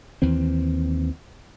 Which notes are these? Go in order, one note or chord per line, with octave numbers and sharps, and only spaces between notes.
D#2 E3 C4